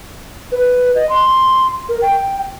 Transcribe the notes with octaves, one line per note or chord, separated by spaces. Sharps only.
B4
D#5
C6
A#4
G5